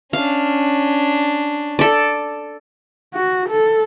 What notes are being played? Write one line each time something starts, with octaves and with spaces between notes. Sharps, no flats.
C#4 D4 F5
A4 D5
F#4
A4